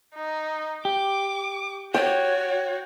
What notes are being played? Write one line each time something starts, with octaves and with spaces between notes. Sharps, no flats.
D#4
G4 D6
F#4 C#5 G5